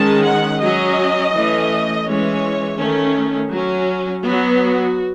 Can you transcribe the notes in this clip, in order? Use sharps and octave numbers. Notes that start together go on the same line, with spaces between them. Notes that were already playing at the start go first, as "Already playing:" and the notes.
Already playing: D#3 G#3 C#4 A5
F#5
F#3 C#4 D#5
E3 A3 C#4
E3 G#3 C#4 C#5
D#3 A3 C#4
F#3 C#4
F#3 B3 F#4